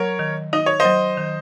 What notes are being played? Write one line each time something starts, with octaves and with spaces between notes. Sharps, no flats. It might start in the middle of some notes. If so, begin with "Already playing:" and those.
Already playing: F#3 A#4 C#5
D#3
D#4 D#5
C#5
C5 D#5
F#3
D#3